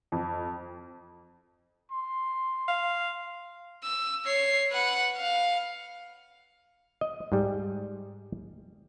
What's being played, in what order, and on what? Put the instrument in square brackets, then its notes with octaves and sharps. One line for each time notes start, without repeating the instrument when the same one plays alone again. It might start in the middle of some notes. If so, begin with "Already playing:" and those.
[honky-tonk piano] F2
[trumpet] C6
[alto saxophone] F5
[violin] E6
C#5 C7
B4 F#5
F5
[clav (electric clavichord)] D#5
G#2 G3